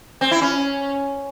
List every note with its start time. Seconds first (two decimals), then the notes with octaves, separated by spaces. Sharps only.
0.21 C4
0.31 E4
0.42 C#4